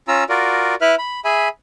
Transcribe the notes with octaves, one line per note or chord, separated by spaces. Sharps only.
C#4 F4 A#5 E6
F4 F#4 A#4 D5
E4 B4 E5 F6 F#6
B5
G#4 E5 G#5 B5